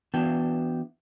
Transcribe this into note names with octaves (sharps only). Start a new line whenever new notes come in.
E3 B3 D4 F#4 G5 A5